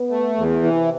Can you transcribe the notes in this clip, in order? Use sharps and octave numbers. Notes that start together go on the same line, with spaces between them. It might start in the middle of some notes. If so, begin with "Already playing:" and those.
Already playing: B3
A3
E2
C3 E3